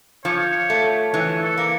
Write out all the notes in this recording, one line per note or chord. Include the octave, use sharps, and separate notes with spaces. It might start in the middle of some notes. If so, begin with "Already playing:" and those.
F3 C#5
A3
E3 C#5
A4
A#3